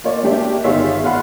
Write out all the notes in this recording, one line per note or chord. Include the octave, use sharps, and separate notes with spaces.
A#3 F4 C#5 D5
G#3 A#3 D4 G4 E5
G1 D#3 F4 G#4 C#5 E5
F4 F5 F#5 B5